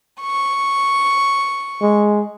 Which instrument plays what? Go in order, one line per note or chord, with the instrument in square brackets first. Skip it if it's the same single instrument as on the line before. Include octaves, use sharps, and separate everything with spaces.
[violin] C#6
[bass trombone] G#3